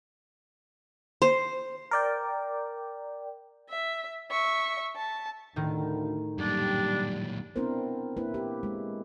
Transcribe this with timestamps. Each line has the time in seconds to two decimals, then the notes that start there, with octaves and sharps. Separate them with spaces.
1.22 C5
1.91 A#4 D5 G5
3.70 E5
4.31 E5 C#6
4.96 A5
5.56 D2 A2 D#3
6.38 F#2 A#2 G3 D4
7.56 B3 C4 D4 E4 A#4 C5
8.17 A#3 E4 B4
8.34 G4
8.63 G#3